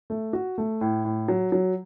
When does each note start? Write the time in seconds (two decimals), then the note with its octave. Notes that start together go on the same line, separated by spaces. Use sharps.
0.10 A3
0.33 F#4
0.58 A3
0.81 A2
1.05 A2
1.28 F#3
1.52 F#3